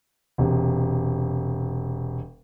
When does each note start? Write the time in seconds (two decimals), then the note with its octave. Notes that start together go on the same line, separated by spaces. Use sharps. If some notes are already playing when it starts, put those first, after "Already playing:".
0.38 E1 C3